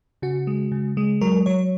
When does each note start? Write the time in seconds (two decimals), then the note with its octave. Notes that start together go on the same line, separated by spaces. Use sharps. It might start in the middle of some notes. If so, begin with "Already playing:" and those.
0.22 C#3 F#4
0.47 G#3
0.72 C#3
0.97 G#3
1.21 F#3 A#4
1.46 F#3 C#5